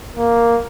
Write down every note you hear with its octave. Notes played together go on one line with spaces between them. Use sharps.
A#3